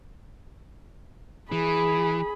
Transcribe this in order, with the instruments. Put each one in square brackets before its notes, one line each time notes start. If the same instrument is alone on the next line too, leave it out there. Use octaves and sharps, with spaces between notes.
[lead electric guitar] E3 [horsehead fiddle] G#4 B5